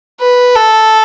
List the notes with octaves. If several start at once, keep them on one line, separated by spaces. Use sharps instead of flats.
B4
A4